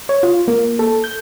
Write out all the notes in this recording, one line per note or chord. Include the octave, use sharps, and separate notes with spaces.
C#5
F4
A#3
A4
G6